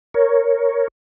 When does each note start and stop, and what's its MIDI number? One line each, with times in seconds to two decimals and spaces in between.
0.14 0.88 70
0.14 0.88 73